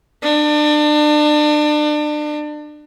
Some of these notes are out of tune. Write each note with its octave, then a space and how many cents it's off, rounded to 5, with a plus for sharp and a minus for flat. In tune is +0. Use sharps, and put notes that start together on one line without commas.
D4 +30